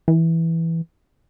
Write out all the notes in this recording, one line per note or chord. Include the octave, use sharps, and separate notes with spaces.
E3